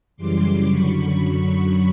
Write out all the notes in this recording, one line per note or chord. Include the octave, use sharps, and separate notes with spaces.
F#2 C#3 E3 G3 C6 D6
F#2 D3 F#3 B5 C#6